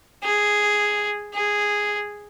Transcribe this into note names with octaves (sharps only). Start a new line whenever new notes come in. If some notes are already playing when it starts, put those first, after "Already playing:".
G#4
G#4